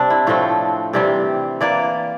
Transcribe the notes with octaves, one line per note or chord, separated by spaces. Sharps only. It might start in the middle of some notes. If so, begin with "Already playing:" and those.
Already playing: C3 G3 C4 D4
E4
A2 F3 A3 C4
C3 E3 G3 C4
E3 A#3 D5